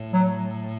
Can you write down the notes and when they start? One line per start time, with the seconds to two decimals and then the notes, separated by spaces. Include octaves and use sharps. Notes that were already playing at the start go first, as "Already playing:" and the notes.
Already playing: A2
0.13 F#3